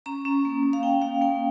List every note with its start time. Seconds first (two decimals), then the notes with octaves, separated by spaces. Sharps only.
0.06 C#4 A#5
0.25 C#4
0.45 A#3
0.63 A#3
0.73 F5
0.83 C#4 G5
1.02 A#3 F5
1.21 A#3 G5